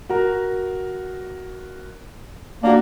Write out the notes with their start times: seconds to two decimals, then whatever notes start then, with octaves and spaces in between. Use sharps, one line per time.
0.09 F#4 A#4 A#5
2.63 A#3 D4 F#4